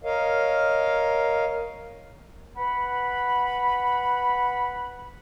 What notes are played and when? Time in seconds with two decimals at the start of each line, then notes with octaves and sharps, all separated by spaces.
0.04 A#4 C#5 D#5 F5
2.57 B4 F#5 B5